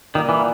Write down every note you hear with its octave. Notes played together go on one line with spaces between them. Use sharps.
A#2 D#3 G3 A#3
E3